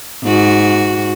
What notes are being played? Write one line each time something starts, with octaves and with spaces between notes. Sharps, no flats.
G#2 F#4